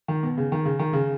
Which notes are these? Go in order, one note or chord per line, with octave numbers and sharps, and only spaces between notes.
D#3
B2
C#3
D#3
C#3
D#3
C#3